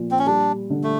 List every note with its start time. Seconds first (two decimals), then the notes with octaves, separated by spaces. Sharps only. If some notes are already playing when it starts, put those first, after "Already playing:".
Already playing: A#2 F3
0.11 C4
0.19 C#4
0.26 G3 D4
0.70 D3
0.84 A3